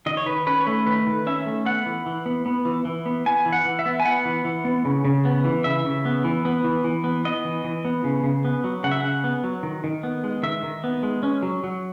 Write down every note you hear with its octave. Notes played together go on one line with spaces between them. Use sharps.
D#3 D#5
C#5
D#3 B4
C#4 B4
C#5
A3 B4
D#3 B4
D#3
C#4 E5
A3
B3 F#5
E3
E3
B3
B3
E3
E3
B3
B3 G#5
E3
F#5
E3
E5
B3
G#5
B3 F#5
E3
E3
B3
C#3
C#3
B3
E3
C#3 E5
C#3
B3
E3
B3
E3
E3
B3
B3 D#5
E3
E3
B3
C#3
C#3
B3
F#3
C#3 F#5
E5
C#3 F#5
B3
F#3
D#3
D#3
B3
G#3
D#3 E5
D#3
B3
G#3
C#4
F#3
F#3